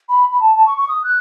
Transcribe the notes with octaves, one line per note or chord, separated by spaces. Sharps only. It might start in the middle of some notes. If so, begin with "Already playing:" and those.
B5
B5
A5
A5
C#6
C#6
D#6
F#6